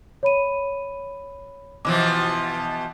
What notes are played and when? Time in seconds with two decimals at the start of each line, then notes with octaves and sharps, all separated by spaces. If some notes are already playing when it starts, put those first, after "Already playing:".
0.23 C#5 B5 D#7
1.85 B2 E3 F3 D6